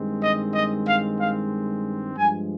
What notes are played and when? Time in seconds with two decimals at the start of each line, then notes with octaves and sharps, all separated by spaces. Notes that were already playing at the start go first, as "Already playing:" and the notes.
Already playing: G2 D#3 G#3 C4
0.21 D#5
0.53 D#5
0.86 F5
1.19 F5
2.16 G2 F3 G#3 G#5